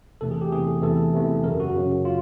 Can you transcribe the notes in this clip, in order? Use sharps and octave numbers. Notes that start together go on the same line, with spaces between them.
E2 C3 E3 A3 A4
G#4
G4
E2 C3 E3 A3 G#4
A4
E2 C3 E3 A3 A4
E2 C3 E3 A3
F#2 C#3 F#3 A#4
F#4
F#2 C#3 F#3
F4